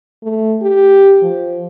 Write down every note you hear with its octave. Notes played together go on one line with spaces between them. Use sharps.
A3
G4
F3